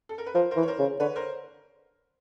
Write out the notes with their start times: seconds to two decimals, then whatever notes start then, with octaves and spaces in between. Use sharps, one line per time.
0.09 A4
0.18 A#4
0.26 B4
0.35 F3 A#4 C5
0.51 A#4 C5
0.56 E3
0.63 C#5
0.68 A#4 C5
0.79 C#3
1.00 D3 B4 C#5
1.16 A#4 C5